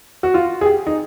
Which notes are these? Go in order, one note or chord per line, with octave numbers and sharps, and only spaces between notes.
F#4
F4
G#4
G4
D#4